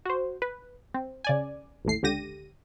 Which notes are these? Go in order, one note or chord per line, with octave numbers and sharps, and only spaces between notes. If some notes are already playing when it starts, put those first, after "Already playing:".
F#4 C5
B4
C4
C#3 D5 G#5
A1 D#2 A2 C7
C#2 D3 G4 A#6 D#7